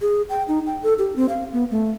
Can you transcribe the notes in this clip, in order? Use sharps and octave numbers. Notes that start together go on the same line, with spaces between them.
G#4
G5
D#4
G5
A4
G4
C4
F5
B3
A3